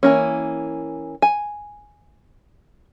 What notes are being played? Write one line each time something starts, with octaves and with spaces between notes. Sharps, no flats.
E3 A#3 C#4
G#5